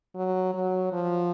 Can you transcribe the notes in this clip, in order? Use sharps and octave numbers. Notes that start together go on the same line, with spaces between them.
F#3
F#3
F3